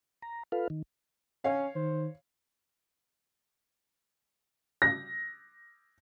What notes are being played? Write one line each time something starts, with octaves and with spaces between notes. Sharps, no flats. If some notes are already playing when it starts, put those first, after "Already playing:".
A#5
F4 A4 B4 F5
D#3
C#4 C#5 F5
D#3 C5
A#6